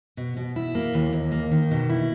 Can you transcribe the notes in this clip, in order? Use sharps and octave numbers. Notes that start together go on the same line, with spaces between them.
B2
B2
E4
A#3
D#2
D#2
A#3
D#3
B2
E4